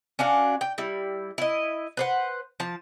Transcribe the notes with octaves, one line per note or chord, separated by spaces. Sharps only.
C#4 D4 F#4 F5
G5
G3 E4
E4 D#5
B4 C5 F#5
F3 A5